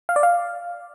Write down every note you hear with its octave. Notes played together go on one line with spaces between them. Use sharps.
F5
D5
F5